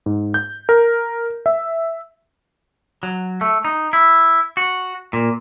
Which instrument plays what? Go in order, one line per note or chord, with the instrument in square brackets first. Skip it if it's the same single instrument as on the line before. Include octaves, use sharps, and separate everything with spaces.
[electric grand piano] G#2
G6
A#4
E5
[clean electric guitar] F#3
A3
D#4
E4
F#4
A#2